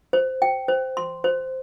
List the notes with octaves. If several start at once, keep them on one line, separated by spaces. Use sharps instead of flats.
C5
G5
C5
C6
C5